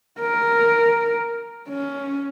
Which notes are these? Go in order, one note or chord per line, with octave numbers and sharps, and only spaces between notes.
A#4
C#4